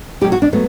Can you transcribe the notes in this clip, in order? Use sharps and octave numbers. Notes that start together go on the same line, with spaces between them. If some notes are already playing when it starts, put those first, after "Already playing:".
B2 F#3 A3 G4
F#4
D4
F#3 A3 B3